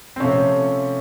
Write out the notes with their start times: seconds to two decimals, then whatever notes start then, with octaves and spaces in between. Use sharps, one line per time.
0.16 C4
0.20 C3 F3 A3 C#4